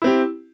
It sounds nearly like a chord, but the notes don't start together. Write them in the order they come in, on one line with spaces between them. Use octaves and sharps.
E4 C4 G4